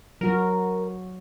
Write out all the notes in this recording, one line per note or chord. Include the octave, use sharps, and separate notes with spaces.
F#3 F#4 A#4